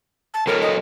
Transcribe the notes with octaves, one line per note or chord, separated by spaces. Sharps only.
A5
F#3 A4 A#4 C#5
D#5